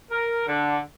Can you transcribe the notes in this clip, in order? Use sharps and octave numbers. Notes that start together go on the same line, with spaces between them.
A#4
D3